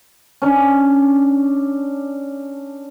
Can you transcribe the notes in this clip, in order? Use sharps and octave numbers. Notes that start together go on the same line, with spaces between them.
C#4 D4